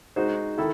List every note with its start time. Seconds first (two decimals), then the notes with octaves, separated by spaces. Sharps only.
0.16 G#3 D#4 F#4 C5
0.58 D#3 E4 A4